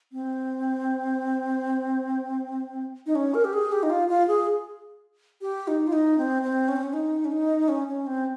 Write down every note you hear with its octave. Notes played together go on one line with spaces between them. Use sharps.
C4
D#4
C#4
A#4
G4
G#4
G4
D#4
F4
F4
G#4
G4
D#4
F4
D#4
C4
C4
C#4
C4
C#4
D#4
C#4
D#4
C#4
C#4
C4